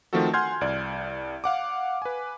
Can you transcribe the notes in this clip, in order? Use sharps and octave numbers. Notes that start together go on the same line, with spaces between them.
D#3 F3 A3 C4 F#4 A4
F#5 G#5 C6 F6 G6 G#6
C2 D5
F5 F#5 D6
B4 G#5